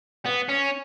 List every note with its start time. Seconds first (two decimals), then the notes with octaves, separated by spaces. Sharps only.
0.26 B3
0.49 C#4